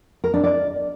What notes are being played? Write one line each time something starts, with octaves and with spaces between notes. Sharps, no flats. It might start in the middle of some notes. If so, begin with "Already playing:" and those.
A#4
D4
D5